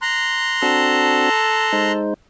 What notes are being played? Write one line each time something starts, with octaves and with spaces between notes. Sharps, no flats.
A#5 C6 F#6
C4 D4 F#4 A4
G#3 D#4 C5